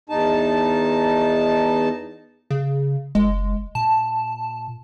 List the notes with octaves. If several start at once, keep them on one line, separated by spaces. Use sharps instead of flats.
E2 D#4 A5
C#3
F#1 G#3
A#2 A5